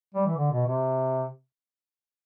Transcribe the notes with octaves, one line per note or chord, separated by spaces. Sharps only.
G3
E3
D3
B2
C3